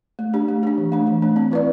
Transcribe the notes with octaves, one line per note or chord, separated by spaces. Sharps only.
A3
D4 G4
A3
D4 G4
E3
A3 D4
E3
A3 D4
C4
E4 B4 D5